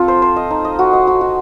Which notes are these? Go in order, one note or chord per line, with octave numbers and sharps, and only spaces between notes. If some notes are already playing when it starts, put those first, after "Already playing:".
Already playing: C4 F4 A4
C5
C5
D#5
D#4
D#5
F#4
D#5
F#4
F#4